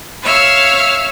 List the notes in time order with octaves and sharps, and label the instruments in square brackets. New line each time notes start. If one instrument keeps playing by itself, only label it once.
[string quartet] C#5 E5 F5